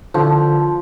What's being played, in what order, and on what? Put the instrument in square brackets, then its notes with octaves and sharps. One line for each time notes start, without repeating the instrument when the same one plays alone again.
[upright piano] D3 [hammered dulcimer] F3